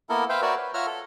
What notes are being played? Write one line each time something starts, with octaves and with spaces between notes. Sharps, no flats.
A#3 B3 E4 A4 A#4
B4 C5 E5 F5 G5
F#4 A#4 B4 C#5 D5 E5
B4
F4 C#5 E5 F#5 A#5 F6
A4